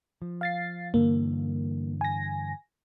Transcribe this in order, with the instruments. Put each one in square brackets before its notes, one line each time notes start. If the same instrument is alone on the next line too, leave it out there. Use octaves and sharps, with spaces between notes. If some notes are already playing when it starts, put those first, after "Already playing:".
[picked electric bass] F3
[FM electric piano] F5 A6 C7
[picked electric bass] G2 D3 E3 [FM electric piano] A#3
[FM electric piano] G#5 A#6